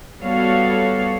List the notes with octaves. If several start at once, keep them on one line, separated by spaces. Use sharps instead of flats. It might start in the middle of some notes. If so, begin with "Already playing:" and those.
G3 B3 F#4 A4 C#5 F5